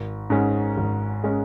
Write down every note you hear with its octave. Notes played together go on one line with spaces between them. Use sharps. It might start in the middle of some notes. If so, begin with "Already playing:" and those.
Already playing: G#1
G#2 G#3 C#4
G#1
G#3 C#4